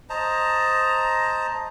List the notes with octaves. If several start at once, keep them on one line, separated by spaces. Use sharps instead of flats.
C5 D#5 A5 A#5